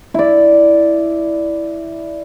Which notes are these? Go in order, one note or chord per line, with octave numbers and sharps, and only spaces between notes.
E4 D5